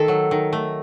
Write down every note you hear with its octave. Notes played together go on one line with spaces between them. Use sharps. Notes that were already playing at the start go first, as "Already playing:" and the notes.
Already playing: D#3 A3 A4
F#3
D#3
A3